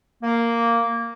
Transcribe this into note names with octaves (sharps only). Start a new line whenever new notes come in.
A#3